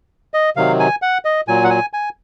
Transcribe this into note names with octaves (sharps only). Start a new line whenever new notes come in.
D#5
C3 D#3 F#3 F5
G#5
F#5
D#5
A#2 F#3 G#5
F#5
G#5
G#5